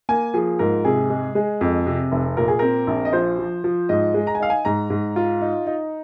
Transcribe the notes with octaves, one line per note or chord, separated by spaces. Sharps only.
A#3 G#5
F3 G#4
G#2 A#4
C3 G#4
G#3
G#3
F2
C3
F1
A#2 A#4
G#4
C4 A#4
A#1
D#5
F3 C5
F3
F3
G#2 D#5
G#3
A#5
G#5
D#4 F5
G#5
G#2 A#5
G#2
F4
D#4
D#4